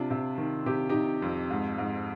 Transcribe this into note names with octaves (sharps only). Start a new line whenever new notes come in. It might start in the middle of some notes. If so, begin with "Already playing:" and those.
Already playing: C3 D4 F4
C3
D#3
C3 G4
C3 D#4 G4
F2
G#2
G#2